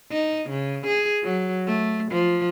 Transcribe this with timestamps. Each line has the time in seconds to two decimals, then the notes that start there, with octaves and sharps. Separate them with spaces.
0.12 D#4
0.50 C#3
0.87 G#4
1.24 F#3
1.67 A3
2.12 F3